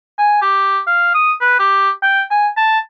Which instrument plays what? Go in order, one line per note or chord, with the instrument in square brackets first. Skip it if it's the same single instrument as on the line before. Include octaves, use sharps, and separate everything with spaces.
[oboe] G#5
G4
F5
D#6
B4
G4
G5
G#5
A5